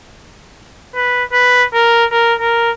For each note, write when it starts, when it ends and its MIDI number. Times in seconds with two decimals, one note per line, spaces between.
0.95 1.24 71
1.32 1.65 71
1.74 2.05 70
2.11 2.35 70
2.40 2.71 70